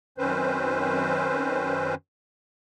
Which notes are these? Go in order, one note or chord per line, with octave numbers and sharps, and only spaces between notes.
F#2 D#3 C4 C#4 B4 C5